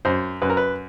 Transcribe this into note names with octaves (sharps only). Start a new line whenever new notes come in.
F#2 C5
F#2 B4
A#4
B4